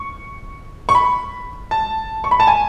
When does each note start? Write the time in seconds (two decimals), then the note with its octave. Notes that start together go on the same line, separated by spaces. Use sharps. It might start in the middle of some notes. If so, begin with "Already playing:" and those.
Already playing: C#6
0.89 C#6
0.95 B5
1.71 A5
2.24 C#6
2.31 B5
2.40 A5
2.47 G#5